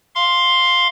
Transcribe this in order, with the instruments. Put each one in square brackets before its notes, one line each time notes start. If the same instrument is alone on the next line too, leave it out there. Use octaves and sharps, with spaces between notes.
[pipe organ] F5 C6